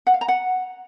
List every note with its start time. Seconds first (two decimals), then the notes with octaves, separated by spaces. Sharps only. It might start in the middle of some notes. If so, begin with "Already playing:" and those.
0.07 F#5
0.14 F5
0.21 A#5
0.28 F#5